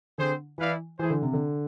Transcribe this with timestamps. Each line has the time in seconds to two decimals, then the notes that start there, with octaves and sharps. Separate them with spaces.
0.18 D3 C4 G#4 C5
0.58 E3 E4 B4 D5 F5
0.99 E3 A3 E4 G#4 C5
1.10 D3
1.22 C3
1.33 D3